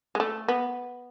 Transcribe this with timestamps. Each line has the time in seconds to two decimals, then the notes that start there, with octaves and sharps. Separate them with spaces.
0.15 G#3
0.20 A3
0.48 B3